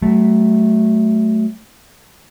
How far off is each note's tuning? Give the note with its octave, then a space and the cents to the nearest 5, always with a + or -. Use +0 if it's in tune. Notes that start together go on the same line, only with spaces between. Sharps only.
F#3 +30 A3 -10